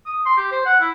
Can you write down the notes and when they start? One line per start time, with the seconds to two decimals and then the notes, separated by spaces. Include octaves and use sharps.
0.06 D#6
0.26 C6
0.38 G4
0.52 C5
0.66 F#5
0.81 E4